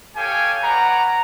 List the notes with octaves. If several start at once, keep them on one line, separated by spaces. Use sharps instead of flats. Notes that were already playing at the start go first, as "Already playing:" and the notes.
G4 A4 C#5 F5 G5 G#5
B4 C#5 D5 F#5 A#5